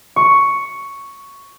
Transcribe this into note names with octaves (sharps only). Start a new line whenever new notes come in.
C#6